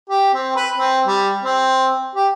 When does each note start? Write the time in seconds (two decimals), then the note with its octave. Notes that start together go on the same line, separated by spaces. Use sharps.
0.10 G4
0.34 C4
0.56 B4
0.78 C4
1.07 G3
1.44 C4
2.15 G4